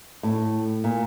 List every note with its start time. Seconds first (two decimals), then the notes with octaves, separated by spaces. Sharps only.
0.23 A2
0.84 A#2